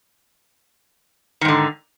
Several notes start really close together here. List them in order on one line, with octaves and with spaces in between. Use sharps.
D#3 G#2 D3